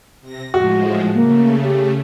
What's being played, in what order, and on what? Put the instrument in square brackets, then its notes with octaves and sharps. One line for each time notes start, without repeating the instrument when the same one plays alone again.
[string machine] C3 A#6
[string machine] A2 F3 G#3 [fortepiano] F#4
[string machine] C#3 A3 [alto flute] A#3
[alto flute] G4